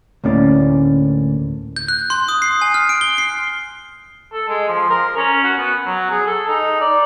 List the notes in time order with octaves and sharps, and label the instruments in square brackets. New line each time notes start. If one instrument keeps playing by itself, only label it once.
[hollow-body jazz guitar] D2 A2 A#3 C#4 D5
[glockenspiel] G6
F#6
C6
D#6
C7
G#5
F6
D7
G7
C7
[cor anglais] A4
G#3
F3
A#4
C#4
F#4
B3
F#3
G#4
A4
D#4
D5